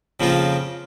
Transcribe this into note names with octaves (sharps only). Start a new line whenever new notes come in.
F2 C#3 F3 A#3 F4